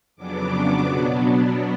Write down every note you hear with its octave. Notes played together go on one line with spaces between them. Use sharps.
F2 C#3 F#3 B3 D4 D6
B2 F#3 B3 D4